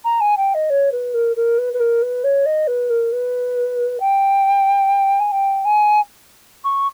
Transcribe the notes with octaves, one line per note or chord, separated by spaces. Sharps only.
A#5
G#5
G5
D#5
C#5
B4
A#4
A#4
B4
B4
A#4
B4
C#5
D#5
B4
A#4
B4
G5
G#5
G5
G#5
C#6